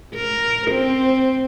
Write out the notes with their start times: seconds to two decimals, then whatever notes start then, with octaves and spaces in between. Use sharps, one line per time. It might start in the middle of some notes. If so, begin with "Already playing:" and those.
0.15 A#4
0.71 C4